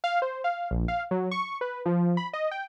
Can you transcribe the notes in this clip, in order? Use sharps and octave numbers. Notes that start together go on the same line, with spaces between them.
F5
C5
F5
A#1
F5
F#3
C#6
B4
F3
B5
D#5
G5